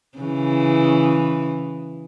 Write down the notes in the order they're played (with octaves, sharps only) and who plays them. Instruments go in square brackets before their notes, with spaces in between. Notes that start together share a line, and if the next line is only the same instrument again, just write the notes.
[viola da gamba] C#3 E3